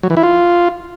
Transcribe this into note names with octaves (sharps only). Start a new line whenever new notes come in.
F#3
E3
E4
F4